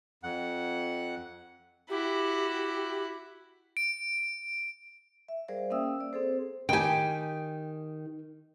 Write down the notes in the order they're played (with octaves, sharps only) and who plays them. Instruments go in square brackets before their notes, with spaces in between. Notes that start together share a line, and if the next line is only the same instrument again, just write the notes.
[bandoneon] F2 F#5
[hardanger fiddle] E4 F#4 [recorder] G4
[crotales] D7
[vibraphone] E5
G3 G#4 A#4 C5 D5 F5
A#3 C#4 E5 G5 D#6 E6
D5
C4 G#4 A4 C5
[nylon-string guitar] D#3 G4 [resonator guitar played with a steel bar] G5 G#5